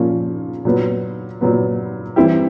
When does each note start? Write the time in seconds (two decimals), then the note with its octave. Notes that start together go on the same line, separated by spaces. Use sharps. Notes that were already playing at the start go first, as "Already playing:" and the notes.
Already playing: A#2 F3 A#3 C#4 F4
0.65 A#2 F#3 B3
1.41 A#2 F#3 B3
2.16 E3 G3 C4 E4 G4